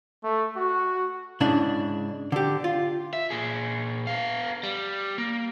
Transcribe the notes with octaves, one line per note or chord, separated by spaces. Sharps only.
A3
F#4
G#2 C#3 D4 E4
D3 G4
F4
E5
A#2 G#4
B3 F5
G3
A#3